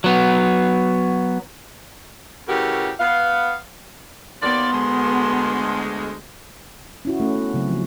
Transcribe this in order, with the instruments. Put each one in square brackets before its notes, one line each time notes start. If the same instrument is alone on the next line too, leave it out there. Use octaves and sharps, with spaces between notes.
[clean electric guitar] F#3 B3
[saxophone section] C#3 E3 A3 F#4 G4 A#4
B3 F5
[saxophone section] D#2 A#3 D5 [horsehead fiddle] B3 [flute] C6
[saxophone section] D2 G#3
[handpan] C#4 E4 F#4
A3 C#4
B3 C#4
C#3 F#3 C4
F3